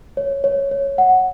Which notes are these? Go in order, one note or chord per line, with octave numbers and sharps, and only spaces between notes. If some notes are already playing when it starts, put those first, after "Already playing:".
C#5
C#5
C#5
F#5